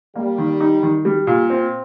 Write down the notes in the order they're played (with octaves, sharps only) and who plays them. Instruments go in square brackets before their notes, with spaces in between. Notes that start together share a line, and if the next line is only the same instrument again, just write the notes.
[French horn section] G3 [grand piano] A#3
[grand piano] D#3
D#4
D#3
G3
A#2
C4